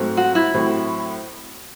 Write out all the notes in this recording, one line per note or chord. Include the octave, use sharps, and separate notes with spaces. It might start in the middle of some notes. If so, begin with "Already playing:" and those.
Already playing: G#2 F#3 A3 C4
F#4
E4
A2 F#3 C4